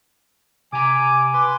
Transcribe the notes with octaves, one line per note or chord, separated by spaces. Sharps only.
C3 G#5 A#5 D6
B4 C6 D6